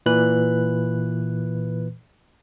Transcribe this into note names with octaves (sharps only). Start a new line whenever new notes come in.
A#2 E3 B4 F#6